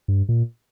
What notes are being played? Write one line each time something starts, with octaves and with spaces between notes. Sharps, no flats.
G2
A#2